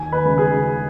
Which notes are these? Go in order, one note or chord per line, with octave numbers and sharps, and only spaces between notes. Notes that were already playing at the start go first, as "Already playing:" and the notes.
Already playing: D#2 G#5
B4
C#3 G#3
G#4